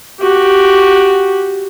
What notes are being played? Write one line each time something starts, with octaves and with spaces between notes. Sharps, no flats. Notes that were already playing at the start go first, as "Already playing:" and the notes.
F#4 G4